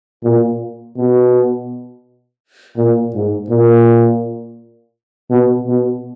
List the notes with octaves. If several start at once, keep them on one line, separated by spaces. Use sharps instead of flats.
A#2
B2
A#2
G#2
A#2
B2
B2